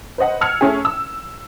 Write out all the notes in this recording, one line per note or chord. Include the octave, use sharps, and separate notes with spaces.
B4 C5 D#5 F#5
E6 F6 G#6 C#7 F7
A3 C#4 G#4
E6